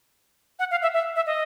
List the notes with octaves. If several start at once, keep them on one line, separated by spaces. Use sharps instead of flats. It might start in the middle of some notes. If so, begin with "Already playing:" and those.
F#5
F5
E5
E5
E5
D#5